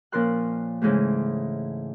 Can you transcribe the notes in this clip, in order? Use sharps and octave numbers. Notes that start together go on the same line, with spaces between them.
A#2 F3 C#4 A#4 C6 F#6
G#2 C#3 E3 G#3 A3